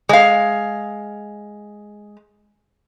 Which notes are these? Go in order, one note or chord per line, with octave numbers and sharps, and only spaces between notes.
G#3 F5